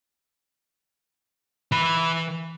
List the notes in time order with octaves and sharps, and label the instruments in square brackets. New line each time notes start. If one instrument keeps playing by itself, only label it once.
[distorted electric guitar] E3 B5